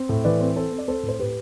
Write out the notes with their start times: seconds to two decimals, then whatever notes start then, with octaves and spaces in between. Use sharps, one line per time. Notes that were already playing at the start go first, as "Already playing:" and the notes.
Already playing: C4
0.09 A2
0.25 E3 B4 D5
0.41 C4
0.56 C4 A4 C5
0.72 C4
0.78 D5
0.88 C4 A4 C5
1.03 A2
1.09 C5
1.19 A2 G4 B4